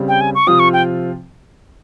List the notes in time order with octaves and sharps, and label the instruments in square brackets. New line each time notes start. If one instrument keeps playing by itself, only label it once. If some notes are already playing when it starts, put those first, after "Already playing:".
Already playing: [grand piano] C#3 G3 C4
[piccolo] G5
G#5
C#6
[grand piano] C3 F3 C4 F4 [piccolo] D#6
[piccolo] C#6
G5